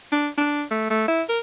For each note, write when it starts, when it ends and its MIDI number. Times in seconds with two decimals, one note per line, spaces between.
0.12 0.28 62
0.37 0.63 62
0.71 0.88 57
0.90 1.07 57
1.08 1.23 64
1.29 1.40 70